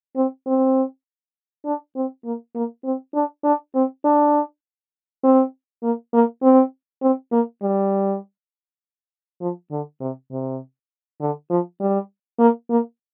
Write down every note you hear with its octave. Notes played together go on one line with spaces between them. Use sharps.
C4
C4
D4
C4
A#3
A#3
C4
D4
D4
C4
D4
C4
A#3
A#3
C4
C4
A#3
G3
F3
D3
C3
C3
D3
F3
G3
A#3
A#3